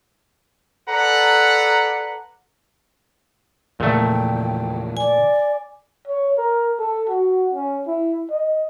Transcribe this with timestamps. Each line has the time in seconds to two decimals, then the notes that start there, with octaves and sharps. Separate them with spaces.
0.88 A4 B4 D5 F#5 A#5
3.80 E2 A#2 C#3 F3 A3 G5
4.97 D5 G#5
6.07 C#5
6.38 A#4
6.79 A4
7.09 F#4
7.53 C#4
7.87 E4
8.30 D#5